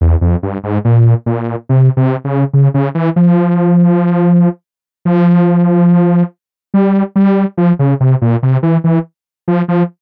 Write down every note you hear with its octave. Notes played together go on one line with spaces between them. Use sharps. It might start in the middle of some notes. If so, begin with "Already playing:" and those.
E2
F2
G2
G#2
A#2
A#2
C3
C3
C#3
C#3
C#3
E3
F3
F3
G3
G3
F3
C#3
C3
A#2
C3
E3
E3
F3
F3